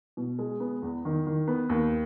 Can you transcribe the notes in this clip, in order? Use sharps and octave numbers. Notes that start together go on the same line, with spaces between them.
B2
G#3
B3
E2
D#3
D#3
B3
D#2